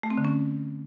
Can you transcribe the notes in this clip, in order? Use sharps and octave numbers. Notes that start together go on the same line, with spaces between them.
A3
C4
D3
C#4